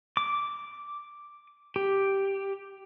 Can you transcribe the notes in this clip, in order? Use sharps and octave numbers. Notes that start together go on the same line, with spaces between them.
D6
G4